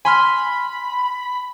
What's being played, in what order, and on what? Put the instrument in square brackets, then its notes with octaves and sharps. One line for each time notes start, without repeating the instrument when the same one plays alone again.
[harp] G#5 C6 F6 [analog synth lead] B5